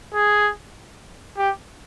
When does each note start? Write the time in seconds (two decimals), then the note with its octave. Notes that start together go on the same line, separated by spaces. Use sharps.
0.14 G#4
1.37 G4